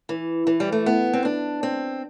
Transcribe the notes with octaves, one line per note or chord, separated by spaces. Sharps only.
E3
E3
G3
A3
B3
C4
D4
C4